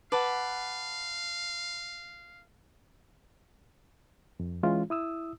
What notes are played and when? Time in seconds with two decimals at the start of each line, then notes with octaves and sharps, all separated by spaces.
0.12 B4 F5 F#5 A5 D6
4.40 F2
4.63 E3 G#3 C#4 F4
4.90 E4 D#6 E6